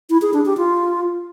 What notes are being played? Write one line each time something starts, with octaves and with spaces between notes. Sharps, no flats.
E4
G#4
D4
G4
F4